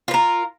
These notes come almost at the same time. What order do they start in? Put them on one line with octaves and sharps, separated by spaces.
F4 B4 A#4